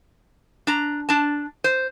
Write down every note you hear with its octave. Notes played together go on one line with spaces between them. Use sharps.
D4 A#5
D4 A5
C5